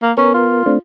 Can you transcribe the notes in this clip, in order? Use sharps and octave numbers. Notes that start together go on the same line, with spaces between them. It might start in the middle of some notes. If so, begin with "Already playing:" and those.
A#3
B3 C#4 A#4
F4
A3 C4 D4